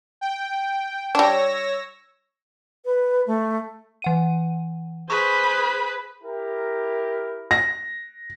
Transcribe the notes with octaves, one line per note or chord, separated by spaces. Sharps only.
G5
G3 D4 C#5 E6 A#6
B4
A3
E3 F#5 D#7
G#4 B4 C5 C#6
E4 G4 A#4
A#6